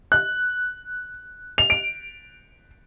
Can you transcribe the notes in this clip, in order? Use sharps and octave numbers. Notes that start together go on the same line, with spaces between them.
F#6
F7
D7